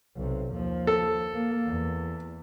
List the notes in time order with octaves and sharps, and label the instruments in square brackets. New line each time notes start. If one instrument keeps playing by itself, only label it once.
[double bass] B1 C3
D#2 F3
[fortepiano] A4
[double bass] A#3
E2